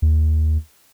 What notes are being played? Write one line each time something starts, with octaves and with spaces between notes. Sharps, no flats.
D#2